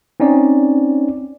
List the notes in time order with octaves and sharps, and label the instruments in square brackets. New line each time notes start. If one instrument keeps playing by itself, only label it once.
[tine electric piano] C4 C#4 D#4 D5